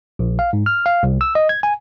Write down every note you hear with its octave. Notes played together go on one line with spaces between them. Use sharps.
A#1
F5
G#2
F6
F5
C2
E6
D#5
G#6
G#5